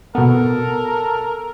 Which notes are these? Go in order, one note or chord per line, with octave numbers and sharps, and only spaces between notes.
B2 B3 A4 A#4